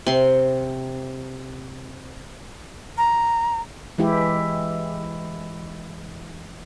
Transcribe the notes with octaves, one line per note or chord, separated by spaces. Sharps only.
C3 C6
A#5
E3 G#3 E4 G4